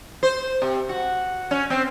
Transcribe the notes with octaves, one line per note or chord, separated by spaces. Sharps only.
C5
C3
F#4
C#4
C4